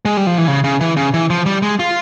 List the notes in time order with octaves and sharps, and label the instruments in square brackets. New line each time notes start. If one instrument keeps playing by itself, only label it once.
[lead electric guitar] G#3
G3
F3
E3
C#3
C#3
E3
C#3
E3
F3
G3
G#3
F4